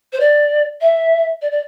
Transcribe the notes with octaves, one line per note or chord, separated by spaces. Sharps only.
C5
D5
E5
D5
D5